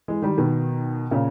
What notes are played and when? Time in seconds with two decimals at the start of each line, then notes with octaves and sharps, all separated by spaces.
0.08 E3 G#3
0.22 D#3 G3
0.38 B2 D#3
1.11 A#2 C#3